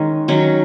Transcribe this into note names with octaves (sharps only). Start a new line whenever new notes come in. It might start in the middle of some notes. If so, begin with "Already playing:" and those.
Already playing: D#3 G#3 C#4 D#5
D#3 F#3 C#4